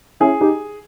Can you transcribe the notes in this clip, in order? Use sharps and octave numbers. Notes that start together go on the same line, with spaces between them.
C#4 E4 G#4
D#4 G4